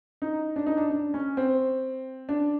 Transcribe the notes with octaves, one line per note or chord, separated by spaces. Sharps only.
D#4
D4
D#4
D4
D4
C#4
C4
D4